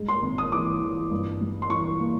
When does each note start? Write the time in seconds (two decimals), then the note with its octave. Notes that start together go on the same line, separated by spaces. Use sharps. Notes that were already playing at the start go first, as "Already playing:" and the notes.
Already playing: G2 G#3
0.08 C6
0.22 G#1
0.38 D#6
0.52 E3 D6
0.81 E3
1.11 G2
1.41 G3
1.62 C6
1.70 E3 C#6
2.00 A#3